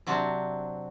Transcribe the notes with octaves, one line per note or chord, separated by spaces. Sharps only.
C3 F#3 C4 D4